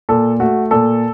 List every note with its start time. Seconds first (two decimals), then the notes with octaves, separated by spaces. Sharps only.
0.09 A#2 A4
0.40 A3 F#4
0.71 A#2 A4